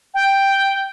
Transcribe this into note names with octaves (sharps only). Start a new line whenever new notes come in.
G5